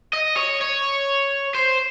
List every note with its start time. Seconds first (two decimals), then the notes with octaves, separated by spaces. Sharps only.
0.13 D#5
0.37 C#5
0.61 C#5
1.55 C5